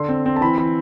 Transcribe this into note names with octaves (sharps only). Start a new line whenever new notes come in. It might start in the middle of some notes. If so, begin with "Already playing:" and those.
Already playing: D3 C6
C4
C4
A5
E3 B5
E3 B5